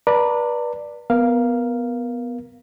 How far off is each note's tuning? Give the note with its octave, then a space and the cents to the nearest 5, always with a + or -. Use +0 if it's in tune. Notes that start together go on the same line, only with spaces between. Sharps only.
B4 -30 D5 +0 A5 +45
B3 +0 A#4 +15 F5 -5